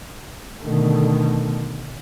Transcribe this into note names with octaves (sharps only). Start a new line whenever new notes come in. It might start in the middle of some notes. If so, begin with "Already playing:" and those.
B2 D3 D#3 A3